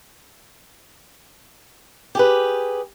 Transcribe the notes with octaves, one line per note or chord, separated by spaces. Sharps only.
G4 G#4 B4